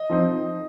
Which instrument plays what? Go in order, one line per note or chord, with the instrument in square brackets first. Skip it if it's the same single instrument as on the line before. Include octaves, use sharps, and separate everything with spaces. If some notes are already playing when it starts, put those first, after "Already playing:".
Already playing: [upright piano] D#5
F3 C4 D#4